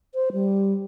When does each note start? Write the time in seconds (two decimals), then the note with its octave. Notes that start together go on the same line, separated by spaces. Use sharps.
0.14 C5
0.33 G3